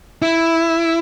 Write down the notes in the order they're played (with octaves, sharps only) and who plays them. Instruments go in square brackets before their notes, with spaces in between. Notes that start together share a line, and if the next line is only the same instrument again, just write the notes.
[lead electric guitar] E4